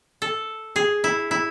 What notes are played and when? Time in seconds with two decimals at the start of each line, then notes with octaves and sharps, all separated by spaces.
0.22 A4
0.76 G#4
1.04 E4
1.31 E4